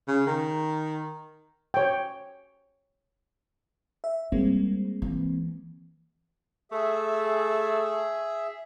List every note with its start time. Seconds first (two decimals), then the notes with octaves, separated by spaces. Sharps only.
0.08 C#3
0.27 D#3
1.74 C#5 G5
4.04 E5
4.32 G3 G#3 A#3 C4
5.02 E3
6.72 A3 G#4 E5